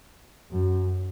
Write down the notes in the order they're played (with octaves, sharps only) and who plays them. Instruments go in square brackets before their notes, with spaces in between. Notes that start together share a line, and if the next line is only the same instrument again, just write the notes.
[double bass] F#2